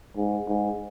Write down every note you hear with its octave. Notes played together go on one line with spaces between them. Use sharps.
G#2
G#2